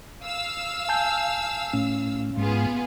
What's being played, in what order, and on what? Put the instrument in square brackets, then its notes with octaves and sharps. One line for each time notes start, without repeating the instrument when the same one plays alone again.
[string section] F5 E6
[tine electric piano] G#5 A5 G6
[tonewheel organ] A2 [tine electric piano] C#4
[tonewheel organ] G#2 [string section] B3 F4 G#4